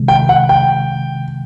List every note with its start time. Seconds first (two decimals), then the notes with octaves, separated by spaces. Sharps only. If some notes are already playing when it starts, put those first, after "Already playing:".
Already playing: C3 D#3 G#3
0.08 G5
0.29 F#5
0.49 G5